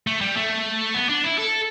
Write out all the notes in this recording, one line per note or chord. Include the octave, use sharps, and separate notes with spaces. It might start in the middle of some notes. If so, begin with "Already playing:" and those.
A3
G3
A3
B3
D4
E4
A4